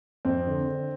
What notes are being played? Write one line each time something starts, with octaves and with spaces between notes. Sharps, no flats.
F2 C4
D3
D3